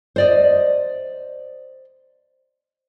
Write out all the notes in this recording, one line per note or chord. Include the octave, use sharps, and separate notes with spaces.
C5 D5 D#5